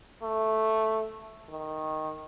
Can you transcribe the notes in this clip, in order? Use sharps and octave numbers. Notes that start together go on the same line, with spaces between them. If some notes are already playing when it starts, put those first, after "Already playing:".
A3
D#3